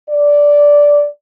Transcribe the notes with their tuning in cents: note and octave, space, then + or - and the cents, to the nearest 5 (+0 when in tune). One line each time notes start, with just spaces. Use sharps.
D5 -10